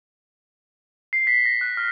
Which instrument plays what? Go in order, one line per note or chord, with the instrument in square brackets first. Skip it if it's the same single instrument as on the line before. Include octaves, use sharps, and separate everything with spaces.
[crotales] C7
B6
A#6
F#6
F6